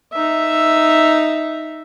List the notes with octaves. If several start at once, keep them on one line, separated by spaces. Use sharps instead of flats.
D#4 E5